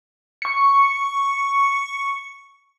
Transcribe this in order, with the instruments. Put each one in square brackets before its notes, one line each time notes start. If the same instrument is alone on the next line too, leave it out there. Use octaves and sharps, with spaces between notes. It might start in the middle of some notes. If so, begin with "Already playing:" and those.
[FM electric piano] C#6 C#7